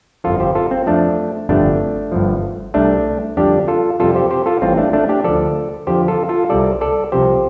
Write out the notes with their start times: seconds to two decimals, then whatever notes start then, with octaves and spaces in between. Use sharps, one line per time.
0.24 G1 F2 F3 F4 A4
0.40 G4 C5
0.55 F4 A4
0.71 C4
0.86 F2 F3 A3 D4
1.49 G1 F2 C3 G3 A3 D4
2.12 G1 G2 D3 F3
2.74 C2 C3 G3 A3 D4
3.37 F2 D3 G3 D4 G4
3.68 F4 A4
4.00 F2 C3 G3 F4 A4
4.15 G4 C5
4.31 G4 C5
4.46 F4 A4
4.62 A1 A2 G3 C4 F4
4.77 A3 D4
4.93 A3 D4
5.09 D4 G4
5.24 D2 D3 F3 A4 D5
5.87 F2 D3 F3 G4 C5
6.08 F4 A4
6.29 F4 A4
6.49 C2 C3 G3 A4 D5
6.81 A4 D5
7.12 C2 C3 F3 G4 C5